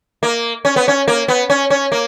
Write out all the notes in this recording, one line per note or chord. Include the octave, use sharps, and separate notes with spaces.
A#3
C#4
B3
C#4
A#3
B3
C#4
C#4
A#3